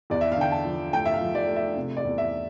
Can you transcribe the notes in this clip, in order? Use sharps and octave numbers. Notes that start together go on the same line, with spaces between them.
E2 D5
E5
F5
D3 G5
A5
F3
A3 G5
E5
F5
F3
D5
A3
E5
C3
D5
E2
E5